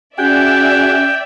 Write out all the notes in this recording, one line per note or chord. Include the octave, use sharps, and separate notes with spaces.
C#4 F#4 G#4 D5 E5 G5